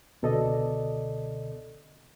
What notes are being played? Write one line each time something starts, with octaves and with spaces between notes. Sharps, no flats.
C#2 B2 D3 A4 D5 D#5